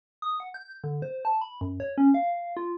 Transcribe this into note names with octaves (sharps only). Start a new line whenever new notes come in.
D#6
F#5
G6
D3
C5
A5
B5
F#2
C#5
C#4
F5
F4